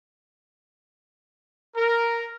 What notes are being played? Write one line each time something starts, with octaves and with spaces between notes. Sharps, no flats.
A#4